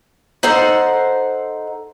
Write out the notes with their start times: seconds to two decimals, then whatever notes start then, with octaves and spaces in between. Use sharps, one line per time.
0.43 D#4 A4 C5 F#5